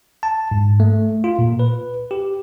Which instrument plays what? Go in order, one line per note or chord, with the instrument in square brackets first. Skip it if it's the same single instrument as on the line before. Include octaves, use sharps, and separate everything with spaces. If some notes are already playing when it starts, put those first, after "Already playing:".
[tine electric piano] A5
G#2
A3
F4
A#2
B4
G4